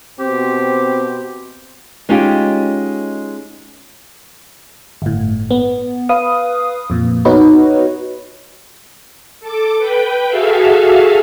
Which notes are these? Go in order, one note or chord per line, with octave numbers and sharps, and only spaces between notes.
B2 C4 G4
G#3 C#4 D#4 F4 G4
G1 A2
B3
B4 F5 D#6
F2 A#2
B3 D#4 F#4 B4 C#5 D#5
A4 D6
B4 G5
F#4 G#4 A4 E5 F5